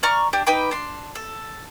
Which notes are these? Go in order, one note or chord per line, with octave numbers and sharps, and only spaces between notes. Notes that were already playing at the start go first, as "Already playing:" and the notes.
D5 A#5 C#6 F6
D4 G4
D#4 B4 G5 D6
D4 C6
A4